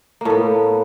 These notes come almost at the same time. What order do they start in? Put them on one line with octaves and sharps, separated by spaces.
A#3 A2 B3